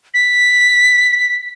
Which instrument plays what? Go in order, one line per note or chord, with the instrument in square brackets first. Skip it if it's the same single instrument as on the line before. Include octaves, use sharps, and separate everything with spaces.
[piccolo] B6